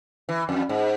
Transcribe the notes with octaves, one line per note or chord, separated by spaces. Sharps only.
E3
F2
G#2